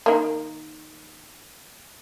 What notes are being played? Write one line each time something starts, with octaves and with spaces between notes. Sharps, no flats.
D#3 A#3